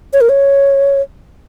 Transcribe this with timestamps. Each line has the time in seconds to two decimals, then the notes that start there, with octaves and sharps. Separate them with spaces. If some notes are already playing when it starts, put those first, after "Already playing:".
0.13 C#5
0.21 A#4
0.29 C#5